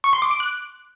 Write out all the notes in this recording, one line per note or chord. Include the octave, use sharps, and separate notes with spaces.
C#6
C6
D6
D7
F#6